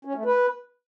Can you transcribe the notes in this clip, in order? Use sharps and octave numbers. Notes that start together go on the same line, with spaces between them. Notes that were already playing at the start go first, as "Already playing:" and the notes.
C#4
A3
B4